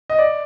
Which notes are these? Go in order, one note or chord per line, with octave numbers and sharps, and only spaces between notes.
D#5
D5